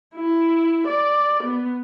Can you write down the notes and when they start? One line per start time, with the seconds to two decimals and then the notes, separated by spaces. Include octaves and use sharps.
0.15 E4
0.87 D5
1.43 B3